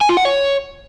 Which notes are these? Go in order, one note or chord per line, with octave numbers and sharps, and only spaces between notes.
G#5
F4
F#5
C#5